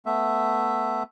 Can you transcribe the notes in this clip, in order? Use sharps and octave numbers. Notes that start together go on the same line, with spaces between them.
A3 B3 E5